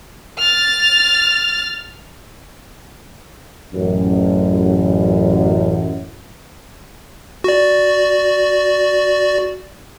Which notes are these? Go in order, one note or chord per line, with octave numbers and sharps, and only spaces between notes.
F6 A6
A1 F#2
F#4 D5